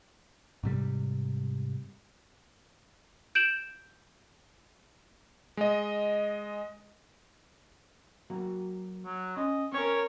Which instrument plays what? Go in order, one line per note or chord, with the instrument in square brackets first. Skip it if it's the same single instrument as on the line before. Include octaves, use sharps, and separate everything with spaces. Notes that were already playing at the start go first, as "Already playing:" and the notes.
[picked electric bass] G#2 C3 G3
[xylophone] G6 D7 E7 F#7
[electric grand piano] G#3 D#5
[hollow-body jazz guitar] F#3 A#3 F#4
[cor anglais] F#3
[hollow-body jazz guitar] C#4 C6 [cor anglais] D#5
[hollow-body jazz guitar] C4 [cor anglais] C#4 [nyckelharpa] A#4 C#5